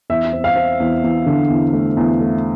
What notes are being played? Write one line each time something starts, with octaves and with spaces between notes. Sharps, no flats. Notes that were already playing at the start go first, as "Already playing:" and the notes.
E2 E5
C4
F5
C4
E2
E2
D3
E2
A3
E2
A3